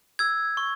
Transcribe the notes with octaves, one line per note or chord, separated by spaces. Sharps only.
E6 G#6
C#6